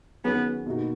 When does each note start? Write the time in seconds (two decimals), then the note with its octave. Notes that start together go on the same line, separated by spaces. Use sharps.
0.24 D#3 F#3 B3 C#4 G#4
0.66 B2 A#3 D#4 F#4